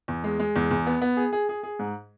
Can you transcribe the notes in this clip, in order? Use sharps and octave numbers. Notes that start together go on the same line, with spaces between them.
E2
G#3
G#3
E2
E2
B3
B3
G#4
G#4
G#4
G#4
G#2